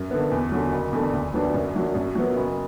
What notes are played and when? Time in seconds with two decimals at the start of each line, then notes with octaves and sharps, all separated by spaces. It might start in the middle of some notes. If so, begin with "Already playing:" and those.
Already playing: F#2
0.11 D3 B3
0.31 E2
0.52 D3 F#3
0.72 F#1
0.93 E2 D3 A3 D4
1.13 D2
1.33 D3 F#3 B3 D4
1.54 F#2
1.75 F#3 D4
1.95 F#2
2.15 F#3 B3
2.36 F#1